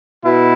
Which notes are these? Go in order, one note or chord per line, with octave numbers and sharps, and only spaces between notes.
B2 E4